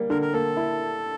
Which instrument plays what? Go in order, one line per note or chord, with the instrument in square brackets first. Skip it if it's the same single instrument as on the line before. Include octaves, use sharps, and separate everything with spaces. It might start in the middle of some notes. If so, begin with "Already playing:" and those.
Already playing: [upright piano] G3 A#3
[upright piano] D3 [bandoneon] A#4
[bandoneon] A#4
[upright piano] A#3 [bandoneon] A4
[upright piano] E4